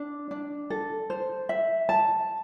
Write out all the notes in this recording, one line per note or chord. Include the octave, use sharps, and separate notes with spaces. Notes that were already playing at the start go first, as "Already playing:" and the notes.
Already playing: D4
D4
A4
C5
E5
A5